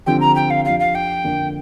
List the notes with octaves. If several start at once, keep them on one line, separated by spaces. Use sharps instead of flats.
D3 F3 C4 G4 G5
A#5
G5
F5
F2 F3 D4 G4 F5
F5
G5
F2 D3 A#3 D4